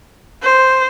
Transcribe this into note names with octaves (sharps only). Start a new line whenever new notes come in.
C5